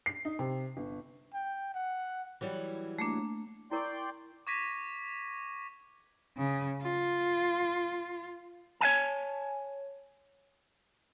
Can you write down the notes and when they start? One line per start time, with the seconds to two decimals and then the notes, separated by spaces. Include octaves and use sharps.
0.06 C7
0.25 D#4
0.39 C3
0.77 G1
1.34 G5
1.74 F#5
2.41 E3 F#3 G3
2.99 A3 A#3 D4
3.71 E4 A#4 D5 G5 C6 C#6
4.47 C#6 D6 G#6 A#6 B6 D#7
6.38 C#3
6.82 F4
8.81 C#5 F5 G#5 A5